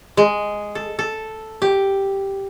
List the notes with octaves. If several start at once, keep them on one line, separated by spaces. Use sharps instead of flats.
G#3
A4
A4
G4